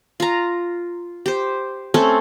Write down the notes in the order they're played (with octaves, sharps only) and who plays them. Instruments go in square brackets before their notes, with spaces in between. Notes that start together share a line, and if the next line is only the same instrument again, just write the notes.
[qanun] F4 A#5
G4 C5
A3 C4 C#4 A4